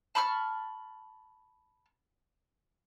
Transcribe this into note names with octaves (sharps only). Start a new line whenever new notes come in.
A5 B5 C#6 F6